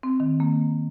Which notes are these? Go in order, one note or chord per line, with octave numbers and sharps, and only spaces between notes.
C4
D#3
A#3